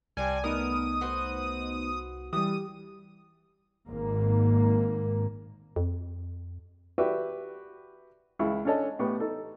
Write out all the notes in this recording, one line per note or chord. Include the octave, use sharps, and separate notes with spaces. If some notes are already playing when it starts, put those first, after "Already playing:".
C2 G3 C4 D4 G#5
A3 B3 D#4 A#4 D#6
F#4 B4 C5
E3 G3 G4 D#6
G#1 G#2 A#3
F2
F#4 G4 B4 D5 E5
C#2 C#3 E4 C#6
C#4 D4 A4 C#5 D#5 A5
A2 B3 G4 C#6
D#4 A4